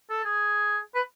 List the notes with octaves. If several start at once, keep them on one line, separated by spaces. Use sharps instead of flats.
A4
G#4
B4